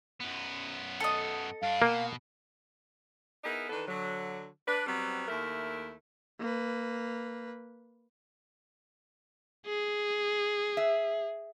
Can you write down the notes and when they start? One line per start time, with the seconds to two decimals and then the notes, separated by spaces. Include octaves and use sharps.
0.20 F#2 B3
1.00 A4 D#5
1.63 G2 D4 F5
1.82 B2 A#3
3.44 B3 D#4 E4 G#4 A#4
3.70 D#3 E3 D4 A4 B4
3.88 D3 F#3
4.67 D4 B4
4.87 F#3 G3 B3 C4
5.28 D#2 A3 E4 A#4
6.40 A#3 B4
9.66 G#4
10.77 E5